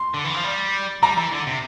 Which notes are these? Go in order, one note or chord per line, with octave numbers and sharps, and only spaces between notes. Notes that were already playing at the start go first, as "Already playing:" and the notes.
Already playing: C6
D3
E3
F3
G3
G3 A#5
E3
D3
C3